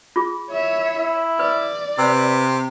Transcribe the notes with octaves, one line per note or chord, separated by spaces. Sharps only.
F4 G#4
E4 C#5 E5
E4
B4 D5
C3 B4 E6